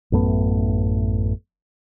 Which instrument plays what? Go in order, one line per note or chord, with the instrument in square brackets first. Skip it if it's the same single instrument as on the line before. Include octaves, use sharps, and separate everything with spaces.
[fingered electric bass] A1 F#2 A3 B3